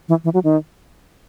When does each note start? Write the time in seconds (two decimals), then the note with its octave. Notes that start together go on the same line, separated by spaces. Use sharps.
0.09 E3
0.24 E3
0.34 F#3
0.44 D#3